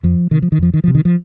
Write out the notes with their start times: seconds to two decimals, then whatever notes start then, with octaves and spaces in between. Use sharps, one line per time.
0.03 F2 F3
0.31 C3 D#3
0.42 F3
0.52 D#3
0.59 F2 F3
0.74 D#3
0.84 C3 F3
0.95 D#3
1.05 F3